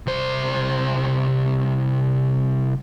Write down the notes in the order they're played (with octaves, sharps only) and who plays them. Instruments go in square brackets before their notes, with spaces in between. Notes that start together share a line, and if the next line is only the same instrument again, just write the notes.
[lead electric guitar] C2 C5